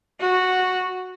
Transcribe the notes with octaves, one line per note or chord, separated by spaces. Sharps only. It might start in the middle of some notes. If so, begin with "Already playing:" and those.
F#4